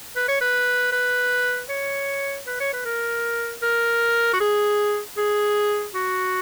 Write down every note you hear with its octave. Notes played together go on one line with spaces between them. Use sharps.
B4
C#5
B4
B4
C#5
B4
C#5
B4
A#4
A#4
F#4
G#4
G#4
F#4